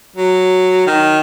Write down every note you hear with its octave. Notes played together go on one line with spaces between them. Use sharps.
F#3
D#3